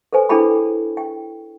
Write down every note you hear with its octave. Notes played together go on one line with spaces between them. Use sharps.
A4 B4 C5 G#5
D4 E4 G#4 A4 G5 B5
G5